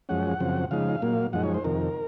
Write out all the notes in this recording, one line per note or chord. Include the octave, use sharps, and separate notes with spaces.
F#2 F3 G#3 C#4 F#5
F#2 C#3 F3 C4
C#3 F3 G#3 D#4 F5
A#2 F#3 A#3
F#2 F3 G#3 D#4 F#5
C#5
C5
F2 C3 D#3 A#4